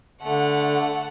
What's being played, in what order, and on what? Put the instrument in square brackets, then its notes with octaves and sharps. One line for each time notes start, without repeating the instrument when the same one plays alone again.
[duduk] D3 [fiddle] A3 F#5